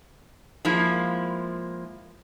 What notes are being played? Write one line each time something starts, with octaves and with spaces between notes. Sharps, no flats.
F3 G#3 A#3 E4